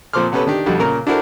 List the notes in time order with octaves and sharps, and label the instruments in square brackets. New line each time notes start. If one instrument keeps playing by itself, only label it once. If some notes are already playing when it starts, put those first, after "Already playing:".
[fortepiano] A#2 F3 C4 C6 D6 F6
C3 B3 C#4 G4 A4 B4
D#3 D4 G4
F2 B2 D3 G3
A#2 C#3 A#4 A#5
D4 E4 F#4 A4 A#4 C5